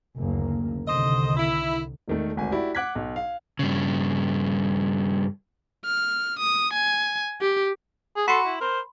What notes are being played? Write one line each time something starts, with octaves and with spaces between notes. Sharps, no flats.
F#1 D2 A#3
C2 D3 D#3 C5 D#5
E4
E1 D#3 A3
D1 G#1 G#5
E4 F#4 G4 D5
F#5 D6 F#6 G#6 B6
B1
F5
G2 C#3
F6
D#6
G#5
G4
G#4
F#4 A4 B5 C6
E4
A#4 C5